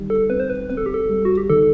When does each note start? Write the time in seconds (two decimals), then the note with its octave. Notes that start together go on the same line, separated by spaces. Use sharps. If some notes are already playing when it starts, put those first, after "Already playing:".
Already playing: D#3 G3
0.10 A4
0.30 C4 B4
0.40 C5
0.50 B4
0.70 C4 B4
0.77 A4
0.86 G4
0.94 A4
1.09 G3
1.25 F#4
1.37 G4
1.49 D#3 A4